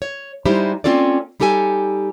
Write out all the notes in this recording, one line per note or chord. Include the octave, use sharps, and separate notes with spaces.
C#5
G3 G#3 D#4 E4 G4 C5
A#3 C4 C#4 F4 A4 D5
G3 D#4 G4 A4 G#5